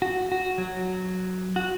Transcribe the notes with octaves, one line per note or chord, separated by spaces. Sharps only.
F#4
F#4
F#3
F#4